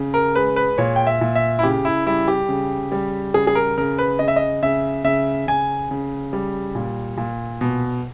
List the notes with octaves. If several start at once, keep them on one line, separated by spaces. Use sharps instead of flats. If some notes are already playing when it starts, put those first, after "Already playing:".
Already playing: C#3
A#4
G#3 B4
B4
A#2 C#5
G5
E5
A#2
E5
E4
C#3 G4
E4
G3 E4
G4
C#3
G3
C#3 G#4
G#4
A#4
C#3 A#4
B4
C#3 D#5
E5
D#5
C#3 E5
C#3 E5
C#3 G#5
C#3
G3
A#2
A#2
B2